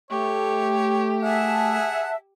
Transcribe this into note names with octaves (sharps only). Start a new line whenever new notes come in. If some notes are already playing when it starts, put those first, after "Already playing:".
A3 G4 C#5
G#4 E5 F#5 A5